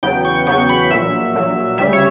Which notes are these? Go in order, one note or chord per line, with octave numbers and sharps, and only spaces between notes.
E2 C#3 F#3 B3 G5
C#6
E2 C#3 F#3 B3 C#6
B5
A#1 A#2 F#3 E5
A#1 A#2 F#3
D2 C#3 G3 E5
C#5